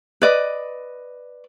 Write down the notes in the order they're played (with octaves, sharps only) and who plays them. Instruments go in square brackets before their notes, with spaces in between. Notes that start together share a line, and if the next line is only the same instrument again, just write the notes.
[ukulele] B4 D5 D#5